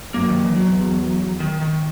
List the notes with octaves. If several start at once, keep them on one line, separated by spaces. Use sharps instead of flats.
F#2 A#3
D#3
E3
E2 F#3
D#3
D#3